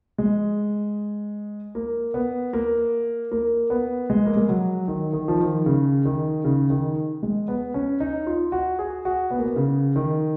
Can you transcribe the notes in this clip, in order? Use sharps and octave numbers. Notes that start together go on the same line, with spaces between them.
G#3
A#3
B3
A#3
A#3
B3
G#3
A#3
G#3
F#3
D#3
D#3
F3
D#3
C#3
D#3
C#3
D#3
G#3
B3
C#4
D#4
F4
F#4
G#4
F#4
B3
A#3
B3
C#3
D#3